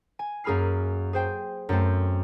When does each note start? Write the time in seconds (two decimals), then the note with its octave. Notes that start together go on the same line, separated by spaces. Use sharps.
0.19 G#5
0.44 F#2 A#3 G#4 B5 F6 C7
1.13 G#4 C5 G5
1.69 F#2 A3 C4